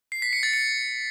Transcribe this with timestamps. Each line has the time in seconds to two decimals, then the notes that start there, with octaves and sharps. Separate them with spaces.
0.12 C7
0.22 B6
0.33 C#7
0.43 A6
0.53 C#7